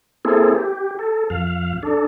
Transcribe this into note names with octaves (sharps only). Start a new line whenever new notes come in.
A#3 C4 E4 G#4 A4
G4
A4
F2 F5
D4 A4